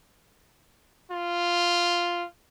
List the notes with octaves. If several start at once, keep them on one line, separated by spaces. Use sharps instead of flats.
F4